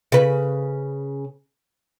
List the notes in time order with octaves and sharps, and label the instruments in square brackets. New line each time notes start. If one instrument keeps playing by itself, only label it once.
[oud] C#3 B4